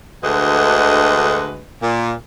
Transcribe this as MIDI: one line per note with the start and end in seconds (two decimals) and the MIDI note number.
0.23 1.63 38
0.23 1.63 50
0.23 1.63 56
0.23 1.63 66
0.23 1.63 71
0.23 1.63 75
1.82 2.12 46